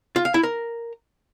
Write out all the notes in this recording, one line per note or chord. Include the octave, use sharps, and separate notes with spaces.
F4
F5
E4
A#4